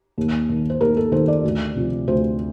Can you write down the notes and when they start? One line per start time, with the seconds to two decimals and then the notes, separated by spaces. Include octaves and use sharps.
0.18 D#2
0.49 D#3
0.70 C5
0.80 D#2 A#4
0.97 A4
1.12 D#3 C5
1.28 D5
1.44 D2
1.75 C3 F3
2.07 D2 C5